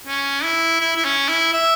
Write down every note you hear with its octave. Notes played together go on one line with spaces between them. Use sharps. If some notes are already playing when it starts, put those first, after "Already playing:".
C#4
E4
E4
E4
C#4
E4
E5